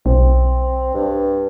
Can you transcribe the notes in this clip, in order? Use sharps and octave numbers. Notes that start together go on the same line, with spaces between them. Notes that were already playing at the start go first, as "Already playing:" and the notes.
B1 C4
G2